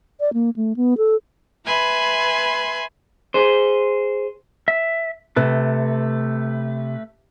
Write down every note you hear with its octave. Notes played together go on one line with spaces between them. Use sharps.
D5
A#3
A3
B3
A4
B4 E5 G#5 B5 C6
G#4 C5
E5
C3 A3 B4